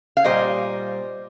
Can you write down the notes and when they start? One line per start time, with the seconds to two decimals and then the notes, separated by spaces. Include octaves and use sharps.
0.17 F5
0.24 A#2 G3 C5 D#5